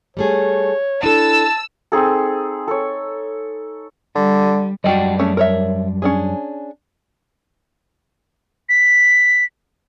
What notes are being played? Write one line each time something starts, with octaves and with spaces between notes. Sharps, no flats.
G3 A3 G#4 C#5
D4 E4 A4 A5 E6
C4 D#4 G#4 A4
A4 C#5
D3 G3
F#2 G3 F#4 G4 D5 D#5
A3 C#4 G#4
A#4 C#5 E5
C#4 D4 G#4
B6